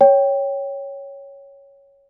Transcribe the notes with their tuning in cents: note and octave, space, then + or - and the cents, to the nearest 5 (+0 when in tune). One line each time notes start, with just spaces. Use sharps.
C#5 +0 G5 +0